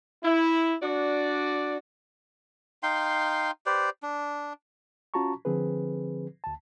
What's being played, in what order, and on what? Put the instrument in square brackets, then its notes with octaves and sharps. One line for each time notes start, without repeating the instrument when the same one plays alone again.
[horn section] E4
D4 F#4 D5
[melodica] D#4 F5 G5 C6
G4 B4 C5 D5
D4
[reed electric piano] C#4 F4 F#4 A5 A#5 C#6
D3 F3 C4 G#4 B4
D2 A5